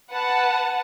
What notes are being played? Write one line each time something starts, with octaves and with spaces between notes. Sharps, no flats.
B4 F#5 A5